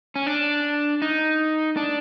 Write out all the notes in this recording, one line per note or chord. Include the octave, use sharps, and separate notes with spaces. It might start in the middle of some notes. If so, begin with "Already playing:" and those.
C#4
D4
D#4
D4